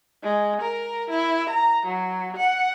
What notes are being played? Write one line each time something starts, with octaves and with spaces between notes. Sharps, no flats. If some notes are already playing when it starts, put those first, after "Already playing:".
G#3
A#4
E4
A#5
F#3
F#5